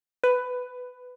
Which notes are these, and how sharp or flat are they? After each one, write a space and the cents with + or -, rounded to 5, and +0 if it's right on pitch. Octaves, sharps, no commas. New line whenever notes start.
B4 +15